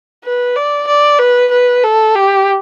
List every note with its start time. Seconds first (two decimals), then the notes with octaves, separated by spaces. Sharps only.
0.24 B4
0.56 D5
0.87 D5
1.19 B4
1.51 B4
1.83 A4
2.15 G4